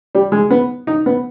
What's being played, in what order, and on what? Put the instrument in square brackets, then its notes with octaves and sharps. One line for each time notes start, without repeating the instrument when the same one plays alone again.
[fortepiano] G3
G#3
B3
D#4
B3